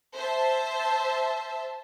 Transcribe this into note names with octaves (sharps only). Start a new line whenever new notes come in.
C5 E5 A5